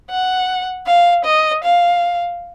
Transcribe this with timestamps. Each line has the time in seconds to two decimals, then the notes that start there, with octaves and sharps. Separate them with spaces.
0.10 F#5
0.86 F5
1.25 D#5
1.64 F5